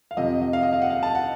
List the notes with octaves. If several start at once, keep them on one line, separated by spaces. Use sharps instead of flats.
F5
F2 C3 F3 D#5
D#5
F5
D#5
F5
F#5
F5
A5
F#5